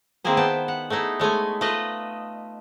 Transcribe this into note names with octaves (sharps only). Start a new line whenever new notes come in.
D#3 A#3 C4 E4 G#4 C5
B3 C5 G5 A5
F#5
A3 B3 D#4 E4 G#4
G#3 A3 C#5 G#5
A3 F4 B4 D#5